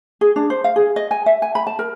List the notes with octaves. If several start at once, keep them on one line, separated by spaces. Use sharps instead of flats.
G#4
D4
C5
F5
G#4
D#5
G#5
E5
G#5
B5
A5
A#4